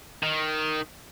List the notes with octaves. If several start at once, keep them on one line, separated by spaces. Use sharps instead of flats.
D#3